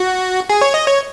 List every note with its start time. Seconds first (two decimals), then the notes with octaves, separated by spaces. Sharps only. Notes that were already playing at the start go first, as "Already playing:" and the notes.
Already playing: F#4
0.50 G#4
0.61 C#5
0.74 D#5
0.88 C#5